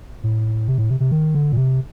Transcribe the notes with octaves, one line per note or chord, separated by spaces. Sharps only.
A2
C3
A2
C3
C3
D#3
D3
A#2
C3